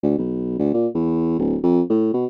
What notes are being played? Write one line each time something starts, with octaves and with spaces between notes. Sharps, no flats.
D2
B1
D2
A#2
E2
D1
F2
A2
B2